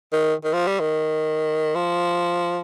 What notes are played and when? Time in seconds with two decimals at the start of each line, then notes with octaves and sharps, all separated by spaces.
0.13 D#3
0.45 D#3
0.53 F3
0.67 G3
0.80 D#3
1.75 F3